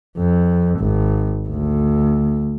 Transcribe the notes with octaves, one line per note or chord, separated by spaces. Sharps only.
F2
G#1
D2